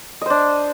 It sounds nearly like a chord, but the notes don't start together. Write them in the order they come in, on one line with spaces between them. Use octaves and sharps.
D#5 C5 D4